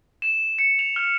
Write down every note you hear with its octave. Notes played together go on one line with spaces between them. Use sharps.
E7
C#7
F7
F6